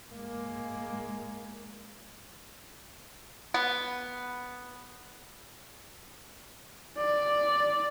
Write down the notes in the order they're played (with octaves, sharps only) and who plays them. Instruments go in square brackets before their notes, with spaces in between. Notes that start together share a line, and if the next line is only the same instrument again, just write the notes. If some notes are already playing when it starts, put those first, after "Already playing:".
[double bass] G#3 A#3
[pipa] B3
[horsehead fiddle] D5